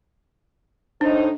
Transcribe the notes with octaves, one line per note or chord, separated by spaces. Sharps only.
A2 D4 D#4 C5